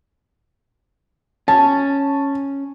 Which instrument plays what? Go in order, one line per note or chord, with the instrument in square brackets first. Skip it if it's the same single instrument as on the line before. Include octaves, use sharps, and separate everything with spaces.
[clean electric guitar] C#4 [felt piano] A5